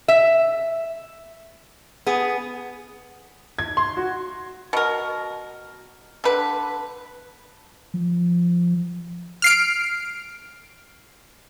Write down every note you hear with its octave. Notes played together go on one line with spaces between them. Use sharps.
E5
B3 G#4
G#6
C6
F#4
B2 A#4
D3 B4
F3
F6 C7 D7